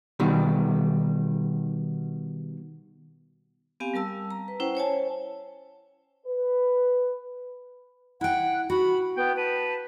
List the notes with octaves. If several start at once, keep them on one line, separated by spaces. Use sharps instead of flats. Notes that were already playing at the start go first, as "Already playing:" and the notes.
B2 D#3 G3
B3 C4 G4 F5 G#5
G3 A#4 A5 E6
A#5
B4
C#4 E4 C5 F#5 G5
C5 C#5 G#5 A5
B4
E4 F#5 G5
F#4 B5
B3 G5
B4 A5